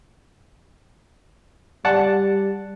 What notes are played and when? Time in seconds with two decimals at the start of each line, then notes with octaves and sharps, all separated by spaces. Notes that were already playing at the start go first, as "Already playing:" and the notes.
1.85 G3 D5 F#5 A5